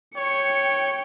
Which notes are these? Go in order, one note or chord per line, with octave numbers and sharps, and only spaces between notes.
C#5 G5 C#7